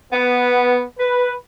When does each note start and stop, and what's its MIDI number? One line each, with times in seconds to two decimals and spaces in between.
0.13 0.82 59
0.98 1.32 71